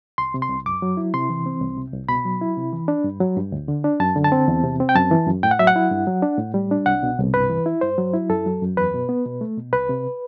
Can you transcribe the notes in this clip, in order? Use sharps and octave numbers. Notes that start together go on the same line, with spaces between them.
C2 C6
C3
C6
C2
F#2 D6
F#3
E4
C3 C6
E3
C4
C2
C3
C2
B2 B5
F#3
E4
C3
E3
D4
G2
F#3
G2
D2
D3
D4
F#2 A5
D3
A5
C4
E2
C3
C4
G5
F#2 A5
E3
F#2
A2 G5
F#5
F#3 E5
F#5
E4
G2
F#3
D4
A2
G3
D4
C2 F#5
B2
C2
G2 B4
E3
E4
G2 C5
F#3
E4
F#2 A4
F#3
F#2
E2 B4
B2
B3
B2
A3
B2
C2 B4
C3